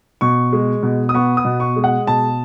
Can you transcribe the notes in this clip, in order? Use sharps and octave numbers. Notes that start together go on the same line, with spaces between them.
B2 C#6
G#3
B2
D#6
B3 C#6
D#6
B2
C#6
G#3
F#5
B2 A5